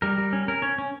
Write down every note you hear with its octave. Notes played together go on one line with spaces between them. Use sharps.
G3 A#4
G3
C#4
C#4 A#4
C#4 C#5
C#4